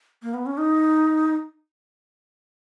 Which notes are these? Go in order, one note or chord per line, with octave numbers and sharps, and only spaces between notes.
A#3
B3
C#4
D#4